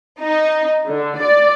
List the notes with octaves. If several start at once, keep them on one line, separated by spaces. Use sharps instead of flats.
D#4
D3
D5